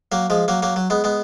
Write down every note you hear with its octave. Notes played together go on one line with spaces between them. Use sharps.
F#3 A#3
F3 G#3
F#3 A#3
F#3 A#3
F#3
G#3 B3
G#3 B3